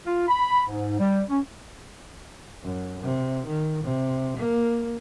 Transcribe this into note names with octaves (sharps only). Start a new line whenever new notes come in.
F4
B5
G#2
G3
C#4
F#2
C3
D#3
C3
A#3